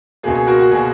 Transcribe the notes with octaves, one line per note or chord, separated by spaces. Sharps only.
C#2 B2 A#3 G#4
G#4
F#4 A#4
F#4
B2 A#3 G#4